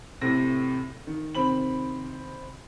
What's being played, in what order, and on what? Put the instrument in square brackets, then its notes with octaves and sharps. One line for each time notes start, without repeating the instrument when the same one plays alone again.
[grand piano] A2 C3 A#6
D#3
C3 D#3 C4 B5 F#7